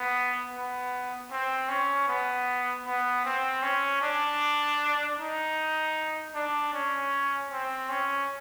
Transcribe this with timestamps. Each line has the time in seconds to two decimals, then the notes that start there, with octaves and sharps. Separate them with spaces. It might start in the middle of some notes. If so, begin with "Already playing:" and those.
Already playing: B3
0.53 B3
1.31 C4
1.69 C#4
2.07 B3
2.85 B3
3.25 C4
3.63 C#4
4.02 D4
5.18 D#4
6.34 D4
6.73 C#4
7.51 C4
7.89 C#4